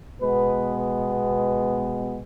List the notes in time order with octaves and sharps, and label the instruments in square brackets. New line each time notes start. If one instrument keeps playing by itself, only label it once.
[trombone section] B2 G#3 B3 B4